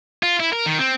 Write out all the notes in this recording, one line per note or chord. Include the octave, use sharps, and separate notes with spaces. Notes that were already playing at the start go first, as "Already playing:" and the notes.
F4
E4
A#4
D#3
C4